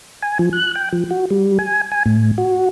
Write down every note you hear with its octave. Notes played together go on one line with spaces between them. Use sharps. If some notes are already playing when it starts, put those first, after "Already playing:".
G#5
F3
F#6
G5
F3
F#4
G3
G#5
G#5
A2
F#4